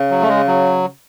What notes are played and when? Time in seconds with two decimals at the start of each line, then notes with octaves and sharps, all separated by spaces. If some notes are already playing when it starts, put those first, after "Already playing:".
Already playing: C#3
0.10 F#3
0.22 A3
0.29 G#3
0.47 F#3